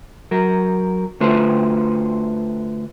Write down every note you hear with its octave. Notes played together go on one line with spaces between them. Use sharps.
F#3 A#4
D2 D3 A3 F4 B4 C5